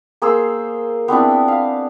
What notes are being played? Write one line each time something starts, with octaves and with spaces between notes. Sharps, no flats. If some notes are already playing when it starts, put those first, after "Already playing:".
A#3 G#4 C5 E6
B3 C4 D4 E4
F5